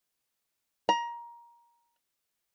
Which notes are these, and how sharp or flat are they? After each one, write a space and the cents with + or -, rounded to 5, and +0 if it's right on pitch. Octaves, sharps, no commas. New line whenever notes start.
A#5 +20